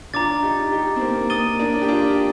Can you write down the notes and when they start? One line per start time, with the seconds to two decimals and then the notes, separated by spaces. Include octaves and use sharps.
0.14 D4 F4 A#5 D6 A6
0.42 D#4 G4
0.72 D#4 G4
0.96 C4
1.01 A#3
1.16 A#3
1.30 A#3 D#6 A6 D#7 G7
1.59 A#3 D4
1.82 G4
1.88 D4 F4